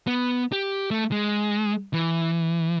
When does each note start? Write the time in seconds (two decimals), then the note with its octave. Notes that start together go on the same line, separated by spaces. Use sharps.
0.07 B3
0.52 G4
0.91 A3
1.12 G#3
1.94 E3